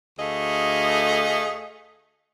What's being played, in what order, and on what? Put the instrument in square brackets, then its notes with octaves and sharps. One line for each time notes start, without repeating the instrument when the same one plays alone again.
[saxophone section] D2 A3 G#4 D#5 F5